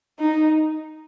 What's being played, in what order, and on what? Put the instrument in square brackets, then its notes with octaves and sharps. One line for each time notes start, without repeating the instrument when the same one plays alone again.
[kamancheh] D#4